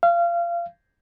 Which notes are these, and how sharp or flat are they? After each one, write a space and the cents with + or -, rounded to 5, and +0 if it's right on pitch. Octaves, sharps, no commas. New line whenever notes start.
F5 -25